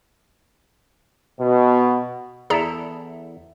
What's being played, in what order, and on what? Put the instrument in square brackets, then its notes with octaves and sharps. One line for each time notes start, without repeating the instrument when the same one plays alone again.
[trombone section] B2
[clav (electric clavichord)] E2 E4 A4 [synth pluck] G#4 D5 A#5